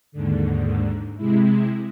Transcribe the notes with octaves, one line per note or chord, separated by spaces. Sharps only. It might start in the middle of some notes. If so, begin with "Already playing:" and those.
D#2 G#2 D3
C3 G#3 E4